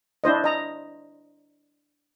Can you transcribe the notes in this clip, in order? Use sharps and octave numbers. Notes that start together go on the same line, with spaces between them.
D4 E4 C5 D#5
D#5 A#5